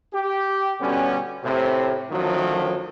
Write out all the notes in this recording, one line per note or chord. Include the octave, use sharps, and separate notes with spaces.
G4
B2 D3 G3 B3 C#4
A2 C3
F#2 A2 D3 D#3 F3 F#3